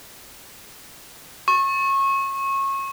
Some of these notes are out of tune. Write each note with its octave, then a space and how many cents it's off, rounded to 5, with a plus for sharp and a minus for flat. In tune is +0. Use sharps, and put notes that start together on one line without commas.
C#6 -25